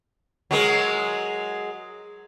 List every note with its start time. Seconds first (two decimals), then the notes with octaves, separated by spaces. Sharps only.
0.51 F#3 G#3 A#4